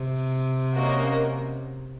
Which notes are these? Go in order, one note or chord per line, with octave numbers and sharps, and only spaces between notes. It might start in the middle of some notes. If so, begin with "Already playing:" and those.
Already playing: C3
A#3 C#4 F#4 A#4 D#5